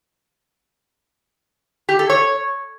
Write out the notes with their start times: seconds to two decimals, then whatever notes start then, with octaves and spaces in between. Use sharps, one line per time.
1.89 G4
1.99 A4
2.10 C#5